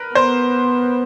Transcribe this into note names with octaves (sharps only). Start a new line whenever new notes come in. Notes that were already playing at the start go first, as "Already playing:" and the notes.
Already playing: A#4 B4
B3 C5